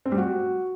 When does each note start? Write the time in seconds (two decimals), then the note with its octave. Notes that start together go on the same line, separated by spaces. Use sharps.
0.06 C4
0.12 G3
0.18 F#4